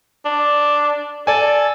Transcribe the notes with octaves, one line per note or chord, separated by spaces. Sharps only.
D4
A4 D5 G#5